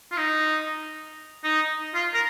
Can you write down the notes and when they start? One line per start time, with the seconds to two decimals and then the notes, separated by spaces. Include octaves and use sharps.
0.12 F4
0.17 D#4
1.44 D#4
1.94 F4
2.14 A#4